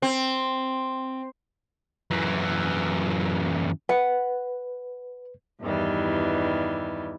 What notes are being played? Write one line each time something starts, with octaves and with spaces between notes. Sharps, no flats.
C4
F#2 E3
B4 F#5
E2 G2 D#3 E3 G3